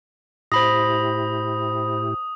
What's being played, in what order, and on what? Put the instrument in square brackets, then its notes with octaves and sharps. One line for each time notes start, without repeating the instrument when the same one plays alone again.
[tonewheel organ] A2 E4 G4 [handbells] C5 B5 A#6 [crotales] D#6